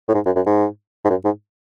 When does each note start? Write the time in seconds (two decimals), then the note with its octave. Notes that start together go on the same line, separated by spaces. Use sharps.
0.09 A2
0.14 G#2
0.26 F#2
0.36 F#2
0.46 G#2
1.05 G#2
1.10 F#2
1.25 G#2